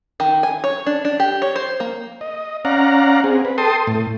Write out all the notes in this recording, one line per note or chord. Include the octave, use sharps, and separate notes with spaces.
D#3
G#5
C#5
D4
D4
G4
C#5
C5
A#3
D#5
C#4 D5 F5 F#5 A#5
C4 G#4
B4
A4 G5 A5 C6 D#6
A2